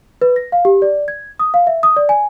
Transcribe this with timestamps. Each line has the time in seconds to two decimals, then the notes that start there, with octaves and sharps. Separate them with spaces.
0.22 B4
0.36 A#6
0.52 F5
0.65 G4
0.82 D5
1.08 G#6
1.39 D#6
1.54 F5
1.67 E5
1.83 D#6
1.97 D5
2.09 G#5